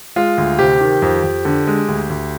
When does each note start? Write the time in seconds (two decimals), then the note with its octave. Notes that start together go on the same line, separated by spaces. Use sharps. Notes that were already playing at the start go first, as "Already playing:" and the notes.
0.16 G#3 F4
0.38 D2
0.59 C3 G4
0.81 D#3
1.02 F2
1.24 F2
1.45 D3
1.67 G#3
1.88 D2
2.10 D2